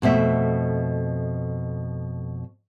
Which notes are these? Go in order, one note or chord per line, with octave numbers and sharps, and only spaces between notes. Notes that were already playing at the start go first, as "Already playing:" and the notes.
F2 B2 A3 E5